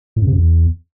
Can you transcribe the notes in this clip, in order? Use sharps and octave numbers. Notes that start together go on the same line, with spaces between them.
A2
F#2
C3
F#2
E2